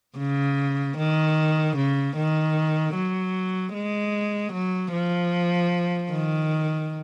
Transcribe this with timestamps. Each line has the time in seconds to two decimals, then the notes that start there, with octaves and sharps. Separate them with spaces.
0.18 C#3
0.97 D#3
1.76 C#3
2.16 D#3
2.95 F#3
3.74 G#3
4.53 F#3
4.93 F3
6.11 D#3